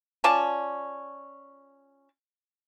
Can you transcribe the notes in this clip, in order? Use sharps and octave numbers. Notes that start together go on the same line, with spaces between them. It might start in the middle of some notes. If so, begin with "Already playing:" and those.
C#4 F4 D5 A5